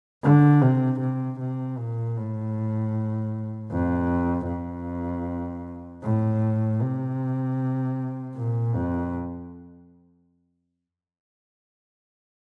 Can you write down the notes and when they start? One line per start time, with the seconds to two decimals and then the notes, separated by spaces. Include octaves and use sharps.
0.23 D3
0.61 C3
1.00 C3
1.39 C3
1.78 A#2
2.16 A2
3.71 F2
4.48 F2
6.03 A2
6.81 C3
8.35 A#2
8.75 F2